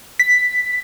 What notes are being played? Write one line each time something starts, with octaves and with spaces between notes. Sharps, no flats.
B6